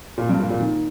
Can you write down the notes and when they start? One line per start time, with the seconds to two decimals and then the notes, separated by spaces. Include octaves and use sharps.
0.18 A#2
0.29 G2
0.40 A#2
0.50 A#2
0.61 D#3